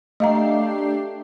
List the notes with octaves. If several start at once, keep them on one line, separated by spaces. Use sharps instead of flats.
A3 D4 G4 D#5 F5 A#5 C7